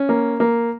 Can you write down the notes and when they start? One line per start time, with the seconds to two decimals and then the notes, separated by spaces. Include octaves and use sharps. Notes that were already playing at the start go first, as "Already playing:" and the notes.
Already playing: C#4
0.09 A#3
0.40 A#3